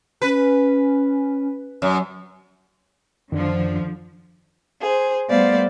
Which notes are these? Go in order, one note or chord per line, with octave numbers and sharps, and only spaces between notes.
C#4 B4
F#2 F#3
F#2 D3 D#3 F3 D4
G#4 C5
G3 A3 B3 C5 D5 F5